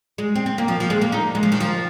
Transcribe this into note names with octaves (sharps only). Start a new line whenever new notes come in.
G#3
C4
C4
A#3
F3
F3
G#3
A#3
D#4
G#3
F3
D#3
F3